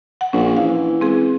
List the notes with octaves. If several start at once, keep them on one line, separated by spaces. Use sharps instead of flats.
F#5
A#1 C#4
E3 F5
G#3 C4 G#4